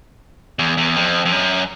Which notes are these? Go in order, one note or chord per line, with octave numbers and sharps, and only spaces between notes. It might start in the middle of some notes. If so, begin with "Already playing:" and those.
E2
E2
F2
F2
F#2